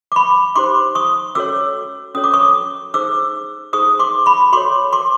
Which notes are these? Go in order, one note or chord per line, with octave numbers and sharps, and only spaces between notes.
D6
B5 C#6
D#4 G4 C5 C6 D6
C#6 D#6
C#4 F#4 A4 C#5 D6 E6
C#4 F#4 A4 C#5 D#6
D6
C#6 D#6
D#4 G#4 C5 D6 E6
D#4 G#4 C5 C#6 D#6
C6 D6
B5 C#6
F#4 A4 C#5 C6 D6
C6 D6